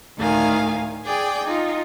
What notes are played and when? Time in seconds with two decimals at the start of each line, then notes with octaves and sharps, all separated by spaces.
0.17 D2 A2 D#3 F5 G#5
1.05 G#4 D5 G5 G#5
1.45 D#4 F4